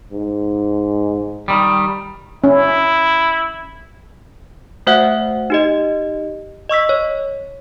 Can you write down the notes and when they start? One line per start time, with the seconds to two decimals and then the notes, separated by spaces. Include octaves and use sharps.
0.12 G#2
1.48 D#3 G3
2.44 C#4 E4
4.87 A3 F#4 C5 E5 F#5 F#6
5.50 D#4 G4 D#5
6.69 D#5 C#6 E6 B6
6.89 C#5